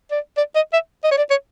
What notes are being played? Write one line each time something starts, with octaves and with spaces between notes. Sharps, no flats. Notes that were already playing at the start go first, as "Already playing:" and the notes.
D5
D5
D#5
E5
D#5
C#5
D5
C#5